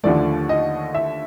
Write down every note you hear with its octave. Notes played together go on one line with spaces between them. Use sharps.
D#2 D3 F3 A3 D5
D#5
E5